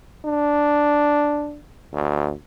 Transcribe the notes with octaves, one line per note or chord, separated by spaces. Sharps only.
D4
D2